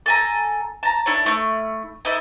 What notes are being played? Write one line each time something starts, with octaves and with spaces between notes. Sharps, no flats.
A4 G#5 A#5
A5 A#5
D4 E4 A4 C#5
A3 E4 F6
D#4 E4 A4 D#5